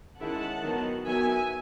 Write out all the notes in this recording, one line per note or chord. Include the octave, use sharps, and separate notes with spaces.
D#3 G#3 C#4 E4 F#5 A5
D#3 F#3 B3
D#3 F#3 B3 E5 G#5